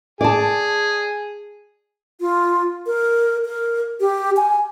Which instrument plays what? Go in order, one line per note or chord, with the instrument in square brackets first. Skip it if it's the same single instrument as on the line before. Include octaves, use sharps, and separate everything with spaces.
[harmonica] G#4 [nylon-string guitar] D5 A5
[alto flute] F4
A#4
A#4
G4
G#5